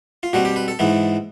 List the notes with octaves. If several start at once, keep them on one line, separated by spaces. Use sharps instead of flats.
F4
B2 G3 C4 F#4
G4
B4
A4
G#2 E3 G#3 B3